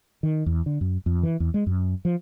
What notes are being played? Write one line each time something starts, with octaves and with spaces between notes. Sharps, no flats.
D#3
E2
D3
F#2
F2
E3
E2
G#3
F#2
F3